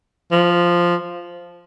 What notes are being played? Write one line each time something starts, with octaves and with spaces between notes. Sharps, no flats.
F3